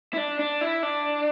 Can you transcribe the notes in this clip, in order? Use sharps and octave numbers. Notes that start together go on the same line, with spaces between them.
E4
D4
D4
E4
D4